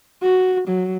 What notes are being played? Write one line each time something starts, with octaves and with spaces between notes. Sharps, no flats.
F#4
F#3